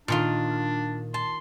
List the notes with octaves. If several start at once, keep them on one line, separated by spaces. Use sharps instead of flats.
A#2 D#3 D4 F4
A5 C6